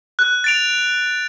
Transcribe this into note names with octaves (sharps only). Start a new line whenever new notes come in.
F#6
A6 D7 F7